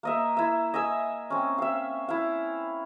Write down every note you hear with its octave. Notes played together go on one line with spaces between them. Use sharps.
A#3 D#5 E5
E4 E5
D#5 E5 G#5 E6
C4 C#4
E5 F5
E4 F5